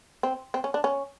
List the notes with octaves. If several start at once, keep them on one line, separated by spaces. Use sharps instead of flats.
C4
C4
C#4
D4
C#4